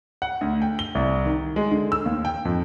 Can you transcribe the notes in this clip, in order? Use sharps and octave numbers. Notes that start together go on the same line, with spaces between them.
F#5
D2
G5
G7
C2
D#3
G#3
D3
E6
D#2
G5
F2